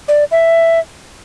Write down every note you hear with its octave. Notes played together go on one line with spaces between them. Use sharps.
D5
E5